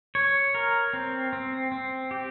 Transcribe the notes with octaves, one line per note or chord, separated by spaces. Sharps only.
C#5
A#4
C4
C4
C4
G4